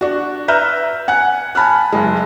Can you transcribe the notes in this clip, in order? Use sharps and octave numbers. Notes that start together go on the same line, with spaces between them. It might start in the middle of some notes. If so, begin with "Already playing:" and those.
D4 F#4
B4 E5 A#5 F6 G6
F#5 G#5 F#6
G#5 A5 B5 F6 F#6
F#1 G#3